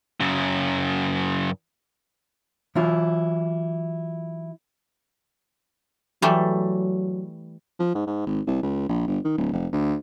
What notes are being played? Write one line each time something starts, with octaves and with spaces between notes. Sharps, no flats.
F#2 C#3
E3 F#3 E4 F4
E3 F#3 G3 A3
F3
G#2
G#2
G#1
C2
C#2
A#1
G1
D#3
D1
F1
D2